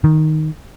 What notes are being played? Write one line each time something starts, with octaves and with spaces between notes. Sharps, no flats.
D#3